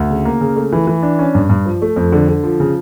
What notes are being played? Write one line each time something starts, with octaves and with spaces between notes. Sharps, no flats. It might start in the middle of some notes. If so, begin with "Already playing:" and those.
Already playing: D2
C#3
A#3
C#3
A3
E3
E3
D4
C#4
G2
G2
F3
A3
F2
D3
D3
F3
C#3